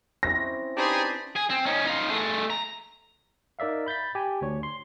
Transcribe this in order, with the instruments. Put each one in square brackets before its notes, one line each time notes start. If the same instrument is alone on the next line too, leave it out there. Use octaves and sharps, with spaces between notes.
[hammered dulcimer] C4 C#4 E4 [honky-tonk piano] A#6
[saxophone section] D4 B4 C5 [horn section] D#4 G4 G#4
[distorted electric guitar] G#4
C4
C#4 D#4
D#4 F4
A3 G#4
A#5
[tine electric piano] D#4 A#4 D5 E5 F5
B5 G6 A6 B6
G4 G#5
D2 D4 C#5
C6